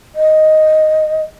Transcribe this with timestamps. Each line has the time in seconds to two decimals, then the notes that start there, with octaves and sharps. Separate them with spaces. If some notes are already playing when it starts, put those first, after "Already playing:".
0.16 D#5